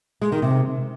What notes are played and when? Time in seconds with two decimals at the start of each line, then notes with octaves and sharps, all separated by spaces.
0.21 G#3
0.32 D#3
0.42 C3